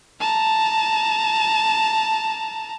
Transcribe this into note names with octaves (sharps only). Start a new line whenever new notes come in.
A5 A#5